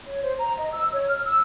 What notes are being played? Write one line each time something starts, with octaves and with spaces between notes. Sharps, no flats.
C#5
C5
A#5
D#5
E6
C#5
F6
E6